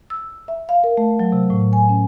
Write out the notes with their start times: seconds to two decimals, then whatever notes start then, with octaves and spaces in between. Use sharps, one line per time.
0.10 E6
0.48 E5
0.69 F5
0.84 A#4
0.97 A3
1.20 F#3
1.32 C3
1.50 A2
1.73 G#5
1.89 C#4